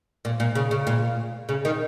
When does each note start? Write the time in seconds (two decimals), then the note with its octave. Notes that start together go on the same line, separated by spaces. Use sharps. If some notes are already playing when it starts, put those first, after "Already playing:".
0.25 A#2
0.40 A#2
0.55 C#3
0.71 C#3
0.87 A#2
1.49 C#3
1.65 D#3